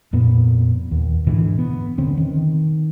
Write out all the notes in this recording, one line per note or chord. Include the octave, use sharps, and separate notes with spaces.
F2 A#2 B3
D#2
G#2 B2 D3 E3
B3
F1 D3 C4 C#4
D#3